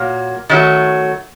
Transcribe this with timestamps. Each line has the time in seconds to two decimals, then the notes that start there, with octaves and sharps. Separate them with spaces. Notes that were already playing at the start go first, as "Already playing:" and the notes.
Already playing: A#2 F#3 A#3
0.49 D#3 F#3 A3